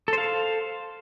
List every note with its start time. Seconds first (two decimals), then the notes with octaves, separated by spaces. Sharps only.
0.08 A4
0.13 C5
0.18 F5